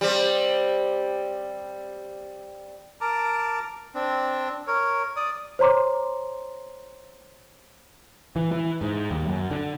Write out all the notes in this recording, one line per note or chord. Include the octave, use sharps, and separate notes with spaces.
G3 C4
A#4 A5 A#5 D6
C4 D4
A#4 C#5
D5 D#6
C5 C#5 A#5 C6 D6
E3
E3
G#2
D#2
F#2
D3